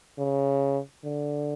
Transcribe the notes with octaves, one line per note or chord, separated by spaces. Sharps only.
C#3
D3